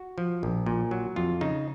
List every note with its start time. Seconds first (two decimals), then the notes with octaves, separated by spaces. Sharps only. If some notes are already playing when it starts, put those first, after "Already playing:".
Already playing: F#4
0.18 F3
0.43 A#1
0.66 A#2
0.91 F#3
1.16 F2 F4
1.41 C#3 D#4